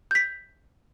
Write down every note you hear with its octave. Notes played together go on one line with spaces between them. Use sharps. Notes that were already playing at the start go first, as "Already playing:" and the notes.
G6 B6